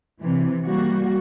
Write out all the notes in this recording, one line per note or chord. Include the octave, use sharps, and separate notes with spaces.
C3 E3
G3 A#3 F#4